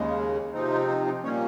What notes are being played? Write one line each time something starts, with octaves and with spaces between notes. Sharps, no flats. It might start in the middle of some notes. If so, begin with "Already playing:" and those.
Already playing: D#2 C#3 G#3
C3 F3 C4 D#4
F4
C5
D#4
A#2 G3 A#3 C#4 C#5